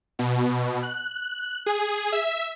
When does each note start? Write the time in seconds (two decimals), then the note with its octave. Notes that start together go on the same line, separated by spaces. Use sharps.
0.19 B2
0.83 F#6
1.66 G#4
2.12 E5